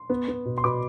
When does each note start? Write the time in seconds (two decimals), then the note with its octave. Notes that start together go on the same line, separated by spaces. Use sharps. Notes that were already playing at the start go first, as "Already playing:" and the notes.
Already playing: C6
0.10 B3
0.28 B3
0.45 B2
0.58 C6
0.64 B2 B5 D6